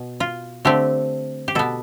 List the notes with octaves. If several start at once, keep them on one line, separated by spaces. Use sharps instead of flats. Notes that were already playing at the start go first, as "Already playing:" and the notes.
Already playing: B2
F4
D3 A3 C4 G4
G4
B2 B3 A4